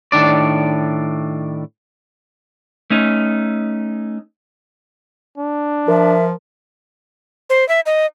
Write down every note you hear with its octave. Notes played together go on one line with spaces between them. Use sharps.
A2 D#3 D4 D5
A3 C#4 D#4
D4
F3 A#4 E5
C5
E5
D#5